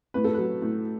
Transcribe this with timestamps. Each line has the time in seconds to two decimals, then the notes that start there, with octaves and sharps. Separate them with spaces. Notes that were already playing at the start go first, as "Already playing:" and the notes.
0.14 A2 B4
0.24 A4
0.34 F#3 B4
0.62 A2